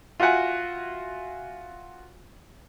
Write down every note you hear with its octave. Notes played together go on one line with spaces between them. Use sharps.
F4 F#4 E5 F#5 G#5